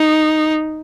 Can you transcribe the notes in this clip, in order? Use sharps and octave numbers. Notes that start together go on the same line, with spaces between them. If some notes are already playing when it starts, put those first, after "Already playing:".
Already playing: D#4